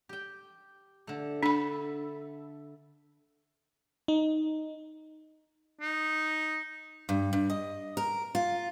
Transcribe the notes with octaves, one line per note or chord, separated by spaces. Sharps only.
G4 G5
D3 A3
A3 D4 A4 B5
D#4
D#4
G2
G2
D#5
A#4
F4